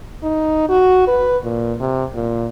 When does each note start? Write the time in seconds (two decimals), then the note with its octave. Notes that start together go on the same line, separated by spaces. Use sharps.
0.23 D#4
0.69 F#4
1.07 B4
1.43 A#2
1.80 C3
2.14 A#2